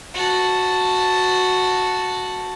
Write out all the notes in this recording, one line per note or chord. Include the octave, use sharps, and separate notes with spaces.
F#4 A5